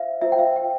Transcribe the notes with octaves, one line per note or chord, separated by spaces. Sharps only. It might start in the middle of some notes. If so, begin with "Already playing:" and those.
Already playing: F4 C5 E5 F5
F4 C5 E5
G5
F5
G5